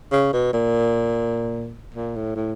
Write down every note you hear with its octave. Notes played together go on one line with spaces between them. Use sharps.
C#3
B2
A#2
A#2
A2
A2